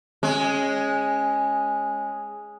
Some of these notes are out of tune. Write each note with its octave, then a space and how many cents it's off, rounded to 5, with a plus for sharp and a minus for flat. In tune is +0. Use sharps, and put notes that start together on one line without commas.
G#3 +0 C#4 -15